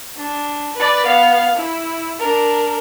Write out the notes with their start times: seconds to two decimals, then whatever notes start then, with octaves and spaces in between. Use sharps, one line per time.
0.16 D4
0.77 B4 D5
1.06 B3 F5
1.55 E4
2.19 D4 A#4